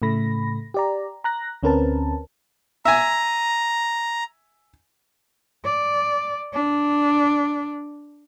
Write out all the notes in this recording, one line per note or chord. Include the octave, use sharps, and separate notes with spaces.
A2 C#3 A3 B5 A#6
G4 D5 A#5
A#5 F#6 A#6
D2 C4 C#4 A#4 B4 A5
E5 G#5 A#5
D5
D4